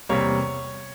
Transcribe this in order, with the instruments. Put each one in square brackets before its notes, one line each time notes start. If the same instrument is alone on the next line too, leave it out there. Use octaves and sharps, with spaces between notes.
[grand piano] E2 C3 G3 A#3 C#5